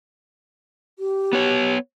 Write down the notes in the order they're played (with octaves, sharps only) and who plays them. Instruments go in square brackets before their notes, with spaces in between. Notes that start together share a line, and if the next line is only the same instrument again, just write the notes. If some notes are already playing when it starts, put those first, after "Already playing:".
[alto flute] G4
[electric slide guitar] B3 C#5